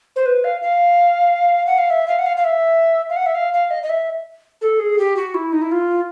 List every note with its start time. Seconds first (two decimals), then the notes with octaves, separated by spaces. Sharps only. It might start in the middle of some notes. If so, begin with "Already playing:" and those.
0.16 C5
0.26 B4
0.44 F5
0.62 F5
1.67 F#5
1.78 F5
1.90 E5
2.08 F5
2.19 F#5
2.26 F5
2.37 F5
2.44 E5
3.10 F5
3.16 F#5
3.26 E5
3.35 F5
3.53 F5
3.71 D#5
3.83 D#5
3.90 E5
4.61 A4
4.80 G#4
4.99 G4
5.17 F#4
5.34 E4
5.52 D#4
5.62 E4
5.72 F4